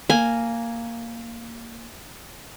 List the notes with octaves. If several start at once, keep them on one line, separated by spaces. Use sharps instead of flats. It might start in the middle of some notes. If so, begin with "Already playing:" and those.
A#3 G#5